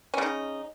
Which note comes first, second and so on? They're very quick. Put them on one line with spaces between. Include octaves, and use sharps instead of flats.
C#4 C#3 D#4